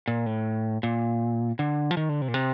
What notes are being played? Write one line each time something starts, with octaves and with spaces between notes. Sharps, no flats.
A#2
A2
A#2
D3
F3
D#3
D3
C3
A#2
C3